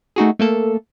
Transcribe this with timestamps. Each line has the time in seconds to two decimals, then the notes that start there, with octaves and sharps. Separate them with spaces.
0.16 A3 D#4 F#4 G#4
0.39 A3 A#3 A4